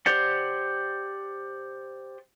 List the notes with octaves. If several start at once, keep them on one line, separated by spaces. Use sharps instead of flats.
G4 C5 D5 F#5